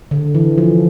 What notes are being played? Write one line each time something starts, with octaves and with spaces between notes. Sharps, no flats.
D3
E3
F3